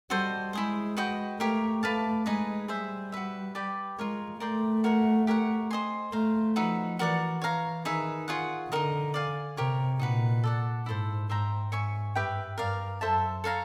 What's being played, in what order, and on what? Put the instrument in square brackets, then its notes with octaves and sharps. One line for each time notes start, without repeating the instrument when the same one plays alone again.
[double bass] G3 [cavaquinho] F#4 A4 C5 D#5
[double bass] G#3 [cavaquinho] E4 G#4 C5
[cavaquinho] F#4 B4 D#5 G5
[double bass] A3 [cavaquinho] G4 A#4 C#5 F5
[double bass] A3 [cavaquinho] B4 D5 F5 A5
[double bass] G#3 [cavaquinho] D#4 G#4 B4 D#5
[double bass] G3 [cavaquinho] G#4 C5 E5
[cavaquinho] F#4 B4 E5
G4 B4 D5 G5
[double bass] G#3 [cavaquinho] F4 A#4 C#5
[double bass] A3 [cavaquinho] A#4 D5 G5 C6
[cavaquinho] F#4 A#4 C#5 F#5
G4 A#4 C#5 F#5
C5 D#5 G#5 C6
[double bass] A3 [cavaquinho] C5 F5 A#5
[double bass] F3 [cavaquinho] D#4 F#4 B4 E5
[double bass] E3 [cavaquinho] F#4 A#4 D5 F#5
[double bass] E3 [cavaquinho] C#5 F5 A#5
[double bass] D#3 [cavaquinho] D#4 G#4 B4 E5
[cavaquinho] F4 G#4 C#5 F#5
[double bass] D3 [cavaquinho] D#4 F#4 A#4 D#5
[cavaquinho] D5 F5 G#5
[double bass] C3 [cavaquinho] G4 A#4 C#5
[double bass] A#2 [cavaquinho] D#4 F#4 B4
[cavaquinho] A4 D5 F#5
[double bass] G#2 [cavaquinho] E4 A4 C5
[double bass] G#2 [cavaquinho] C5 E5 G5 A#5
[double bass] G#2 [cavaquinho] C#5 E5 G#5 C#6
[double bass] G2 [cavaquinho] G4 B4 E5 G5
[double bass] G2 [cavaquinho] A#4 D5 F5
[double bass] F#2 [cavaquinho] A4 C5 E5 A5
[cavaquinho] A4 C#5 F5 A#5